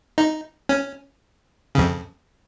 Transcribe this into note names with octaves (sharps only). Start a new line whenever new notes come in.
D#4
C#4
F2 C#3